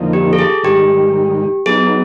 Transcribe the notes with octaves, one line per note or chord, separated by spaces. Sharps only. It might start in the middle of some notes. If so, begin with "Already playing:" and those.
Already playing: F2 D3 F3 A#3 D#4
G4
A4
G#4
G#2 D#3 G3 G4
F#3 B3 D#4 G#4